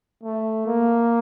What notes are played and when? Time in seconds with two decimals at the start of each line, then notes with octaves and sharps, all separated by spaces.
0.23 A3
0.66 A#3